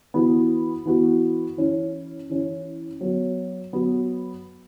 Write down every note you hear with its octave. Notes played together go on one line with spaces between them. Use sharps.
E3 B3 F#4
E3 B3 F#4
E3 C#4 E4
E3 C#4 E4
F#3 B3 F#4
F#3 B3 F#4